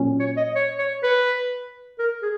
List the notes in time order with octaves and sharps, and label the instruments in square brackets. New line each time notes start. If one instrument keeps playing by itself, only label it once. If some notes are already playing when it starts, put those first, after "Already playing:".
Already playing: [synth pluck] A#2 F#3 C#4
[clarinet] C#5
D#5
C#5
C#5
B4
A#4
G#4